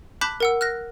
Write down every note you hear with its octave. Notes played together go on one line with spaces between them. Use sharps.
A5 B5 D6 F#6 G6 B6
A#4 F#5 E6
F6 F#6 A#6